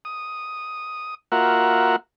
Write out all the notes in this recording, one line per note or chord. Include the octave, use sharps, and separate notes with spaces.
D#6
A#3 F4 F#4 A#4 E5 F#5